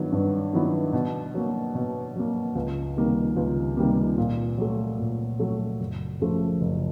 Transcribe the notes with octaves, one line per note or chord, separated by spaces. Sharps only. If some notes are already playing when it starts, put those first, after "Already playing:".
Already playing: G2 D#3 F#3 B3 E4
G2
D#3 F#3 B3 E4
B2
F#3 A#3
B2
F#3 A#3
C#2
C3 D#3 G3 A#3
C#2
C3 D#3 G3 A#3
A#2
F#3 A3
A#2
F#3 A3
F#1
F#2 C#3 F3 A3
F#1